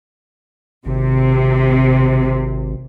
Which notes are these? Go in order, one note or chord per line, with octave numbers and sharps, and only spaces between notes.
G#1 C3